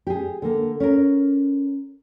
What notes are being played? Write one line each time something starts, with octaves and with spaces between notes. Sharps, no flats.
G4 G#4
D3 A#3
C#4 A#4